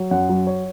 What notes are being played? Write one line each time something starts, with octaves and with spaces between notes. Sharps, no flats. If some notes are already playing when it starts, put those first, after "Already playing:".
Already playing: F#3
F#2 F#5
F#3
C#5